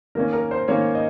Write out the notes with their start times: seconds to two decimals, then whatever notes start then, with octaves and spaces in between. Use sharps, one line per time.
0.15 D#3 A#3 C#4 A#4
0.33 A#4
0.51 C5
0.68 D#3 A#3 C#4 C#5
0.95 D#5